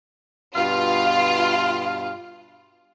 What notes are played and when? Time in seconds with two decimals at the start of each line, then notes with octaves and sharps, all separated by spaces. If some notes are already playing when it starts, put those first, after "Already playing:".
0.55 G2 B2 F4 F5